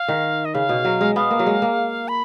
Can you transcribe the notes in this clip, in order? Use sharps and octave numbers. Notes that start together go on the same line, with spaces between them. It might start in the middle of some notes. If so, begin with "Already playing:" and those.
Already playing: F5
D#3
D#5
C#3 F5
B2
F#3
G#3
B3 F5
A#3
F#3
G#3
A#3
B5